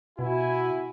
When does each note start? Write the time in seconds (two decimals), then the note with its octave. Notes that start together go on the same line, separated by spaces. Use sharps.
0.19 B2 E4 F#4 G#5